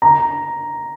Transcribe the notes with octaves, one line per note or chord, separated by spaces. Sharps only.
A#5